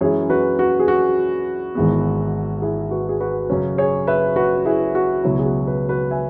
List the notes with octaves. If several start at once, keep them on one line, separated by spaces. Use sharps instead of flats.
F#2 E3 G#3 E4 G#4 C#5
F#4 B4
F#4
G#4
F#4
G#1 G#2 E3 G#3 B3
E4 G#4
F#4 B4
G#4
F#4 B4
F#2 C#3 F#3 C#4
G#4 C#5
B4 E5
F#4 B4
E4 G#4
F#4
C#2 B2 F#3 E4
G#4
F#4
F#4 B4
F#4 B4
E5 G#5